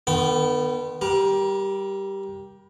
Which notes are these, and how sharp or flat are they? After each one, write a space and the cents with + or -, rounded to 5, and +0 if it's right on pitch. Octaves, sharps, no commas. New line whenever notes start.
D3 +45 B3 +0 G5 -35
G3 +0 A#4 +30